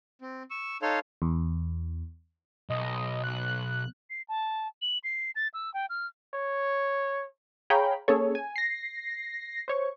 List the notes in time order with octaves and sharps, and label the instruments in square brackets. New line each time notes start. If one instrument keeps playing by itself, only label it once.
[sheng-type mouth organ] C4
C#6 E6
D#4 A4 C#5 F5 C6 F6
[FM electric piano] E2
[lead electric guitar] B1 [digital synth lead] D#5
[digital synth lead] F#6
[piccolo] C7
A5
F#7
C7
A6
E6
G5
F6
[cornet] C#5
[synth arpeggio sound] G#4 C#5 F5 G5 A#5 B5
A#3 C#4 G#4 A4 C#5
G#5
A#6 C7
C5 C#5 C#6